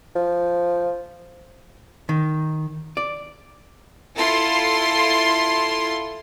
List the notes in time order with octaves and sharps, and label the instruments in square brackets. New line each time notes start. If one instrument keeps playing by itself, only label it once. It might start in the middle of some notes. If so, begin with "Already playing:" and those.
[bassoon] F3
[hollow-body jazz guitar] D#3
D5
[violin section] E4 F4 A4 C6